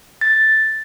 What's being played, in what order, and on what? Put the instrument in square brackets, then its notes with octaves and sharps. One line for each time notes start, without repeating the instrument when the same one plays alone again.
[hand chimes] A6